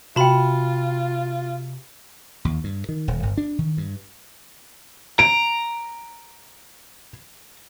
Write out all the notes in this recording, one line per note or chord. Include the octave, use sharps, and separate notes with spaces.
C3 F4 F#4 G5 A5 B5
D#2
G2
D#3
D#1
G1
D4
D#3
G2
A#5 D7